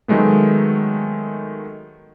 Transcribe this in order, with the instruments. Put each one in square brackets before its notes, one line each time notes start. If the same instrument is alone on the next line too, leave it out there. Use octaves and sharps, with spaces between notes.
[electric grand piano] D#3 F#3 G#3 A3 B3